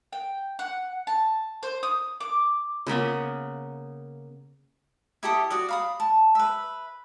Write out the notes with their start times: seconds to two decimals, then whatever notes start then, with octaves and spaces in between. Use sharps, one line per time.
0.13 G5
0.59 F#5
1.07 A5
1.63 C5
1.83 D#6
2.20 D6
2.87 C#3 A#3 B3 C#4
5.23 E4 G4 A4 D#6
5.50 F#4 D5 D#6
5.69 F5 B5 D#6
6.00 A5
6.35 B4 E5